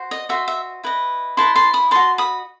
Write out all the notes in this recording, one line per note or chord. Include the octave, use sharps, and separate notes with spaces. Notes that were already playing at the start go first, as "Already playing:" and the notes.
Already playing: F#4 C5
D#5
F#4 C5 D#5 E5
E5
E4 B4 D#5
E4 B4 D#5 A5 C6
A5 C6
B5 D#6
F#4 C5 D#5 A5 C6
B5 D#6